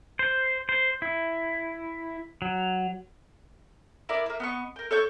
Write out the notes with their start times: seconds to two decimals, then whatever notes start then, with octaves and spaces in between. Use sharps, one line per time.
0.19 C5
0.69 C5
1.02 E4
2.42 F#3
4.09 E4 A#4 D5 D6
4.26 A#3 E5
4.40 B3 D#5 C#6
4.76 A#4 G5
4.91 A4 C#5 C#6 G6